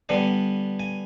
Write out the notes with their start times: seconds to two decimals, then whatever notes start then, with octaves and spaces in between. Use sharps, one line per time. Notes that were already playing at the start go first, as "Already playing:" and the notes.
0.09 D3 G3 B3 G#5
0.80 G#5